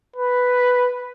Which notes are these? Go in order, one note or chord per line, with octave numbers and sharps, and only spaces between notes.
B4